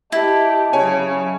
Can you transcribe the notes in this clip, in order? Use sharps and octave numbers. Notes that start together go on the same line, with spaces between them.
E4 G4 D#5 A5
C#3 F#3 C#5 G#5